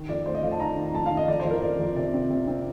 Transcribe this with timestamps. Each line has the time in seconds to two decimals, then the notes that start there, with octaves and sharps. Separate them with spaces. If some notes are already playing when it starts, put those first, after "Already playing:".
Already playing: D#3
0.09 F2 D5
0.26 A3 C5
0.34 D#5
0.43 F2 F5
0.51 A5
0.60 D#3 A#5
0.77 D#3
0.94 F2 A5
1.06 F5
1.11 D#3
1.17 D#5
1.28 F2 D5
1.40 C5
1.45 F2
1.51 A#4
1.62 F2 D5
1.80 F2
1.96 C3 D5
2.13 C4
2.30 C3
2.47 C4